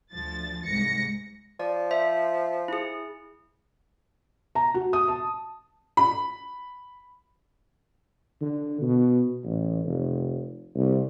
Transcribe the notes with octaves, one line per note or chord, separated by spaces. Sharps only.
D2 F3 A6
C2 G#2 A#6 C#7
F3 D5
C5 E5
E4 G#4
A#5
F#4
D#6
A5
B5
D3
B2
A1
F1
C2